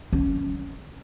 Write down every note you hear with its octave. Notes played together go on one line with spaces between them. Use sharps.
C#4